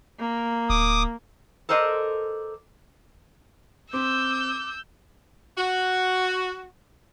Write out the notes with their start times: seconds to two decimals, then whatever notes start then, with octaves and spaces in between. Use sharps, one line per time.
0.19 A#3
0.70 D1 D6 D#6
1.69 A4 A#4 C5 D5 D#5
3.93 C4 D6 E6 G6
5.58 F#4